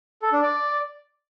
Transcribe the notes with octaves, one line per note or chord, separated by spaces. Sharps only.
A4
D4
D5